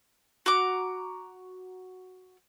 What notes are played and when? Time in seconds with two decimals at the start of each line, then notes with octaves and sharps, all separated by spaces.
0.46 F#4 A#5 D6